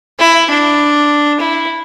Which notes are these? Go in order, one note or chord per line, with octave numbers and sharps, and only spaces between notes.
E4
D4
E4